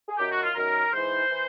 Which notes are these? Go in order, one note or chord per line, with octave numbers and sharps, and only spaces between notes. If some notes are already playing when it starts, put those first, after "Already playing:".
G#4
F#2 D#3 G4
F#4
F4
F#2 D#3 A#4
G#2 E3 C5
E3